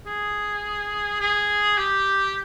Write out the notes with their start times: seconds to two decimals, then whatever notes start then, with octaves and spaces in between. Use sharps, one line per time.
0.06 G#4
1.20 G#4
1.78 G4